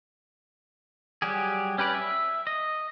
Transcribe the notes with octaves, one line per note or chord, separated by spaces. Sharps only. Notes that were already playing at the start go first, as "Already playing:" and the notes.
F#3 G3 G4 G#4
C#4 G4 B4 D5
E5
D#5